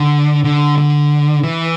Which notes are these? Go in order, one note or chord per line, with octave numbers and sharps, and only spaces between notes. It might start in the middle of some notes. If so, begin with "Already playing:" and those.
Already playing: D3
D3
D3
E3